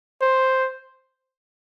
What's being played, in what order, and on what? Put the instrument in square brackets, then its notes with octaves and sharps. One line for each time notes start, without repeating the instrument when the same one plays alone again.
[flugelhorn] C5